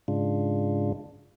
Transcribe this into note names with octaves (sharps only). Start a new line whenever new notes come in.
G#2 C#3 G#3 D4 F4